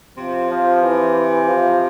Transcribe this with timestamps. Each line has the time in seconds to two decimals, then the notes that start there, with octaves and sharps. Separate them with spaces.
0.17 C3 F3
0.50 F3
0.82 E3
1.48 F3